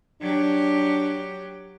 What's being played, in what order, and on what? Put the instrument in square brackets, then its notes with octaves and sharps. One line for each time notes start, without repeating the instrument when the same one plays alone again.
[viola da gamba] F#3 G4 [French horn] D4